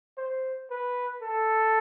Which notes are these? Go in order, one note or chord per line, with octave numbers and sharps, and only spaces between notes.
C5
B4
A4